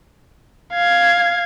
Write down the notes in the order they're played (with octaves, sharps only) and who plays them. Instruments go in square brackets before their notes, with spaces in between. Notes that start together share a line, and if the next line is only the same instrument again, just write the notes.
[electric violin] F5 G#6